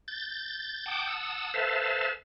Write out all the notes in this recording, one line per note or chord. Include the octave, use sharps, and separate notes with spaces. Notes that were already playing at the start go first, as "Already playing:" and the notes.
G6 A6
F#5 G5 A5 D6 D#6 G6
F#5 A5 D#6 E6
A4 B4 C5 E5 F5 A5